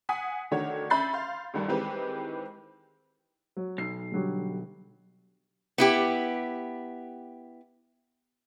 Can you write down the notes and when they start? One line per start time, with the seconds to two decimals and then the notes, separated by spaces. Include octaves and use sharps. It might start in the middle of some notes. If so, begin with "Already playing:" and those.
0.09 F#5 G#5 D#6 B6
0.51 D3 D#3 A3 D4 F#4 C#5
0.90 C#4 E5 B5 G6 A6 C7
1.13 F5 C6
1.54 D2 G2 D#3 G3
1.68 D#3 E3 G#3 C4 G4 B4
3.57 F#3
3.78 B1 C7
4.12 D3 F#3 G3
5.78 B3 E4 G4